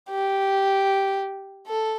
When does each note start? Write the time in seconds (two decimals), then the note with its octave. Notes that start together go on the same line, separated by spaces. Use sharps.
0.10 G4
1.68 A4